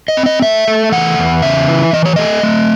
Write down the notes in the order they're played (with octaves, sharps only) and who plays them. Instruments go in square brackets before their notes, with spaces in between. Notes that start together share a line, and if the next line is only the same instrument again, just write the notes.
[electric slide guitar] D#5
C4
D#5
A3 E5
A3
E3 F#5
E2
C#3 E5
E3
E3 D#5
C#5
A3 D#5
A3